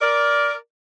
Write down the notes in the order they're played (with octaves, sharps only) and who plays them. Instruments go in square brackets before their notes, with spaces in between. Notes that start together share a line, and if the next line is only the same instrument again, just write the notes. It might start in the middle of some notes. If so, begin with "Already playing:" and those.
[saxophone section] A#4 D5